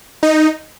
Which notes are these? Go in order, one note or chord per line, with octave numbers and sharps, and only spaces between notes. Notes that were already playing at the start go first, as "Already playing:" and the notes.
D#4